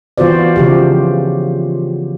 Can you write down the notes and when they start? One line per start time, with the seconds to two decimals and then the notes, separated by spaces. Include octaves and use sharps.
0.18 E3 B3 F4 F#4 C5 D5
0.56 C#3 F3 G4